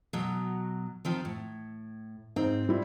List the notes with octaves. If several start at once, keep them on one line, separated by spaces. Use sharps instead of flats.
B2 F#3
D#3 F3 C4
A2
G#2 C4
G3 E4 F4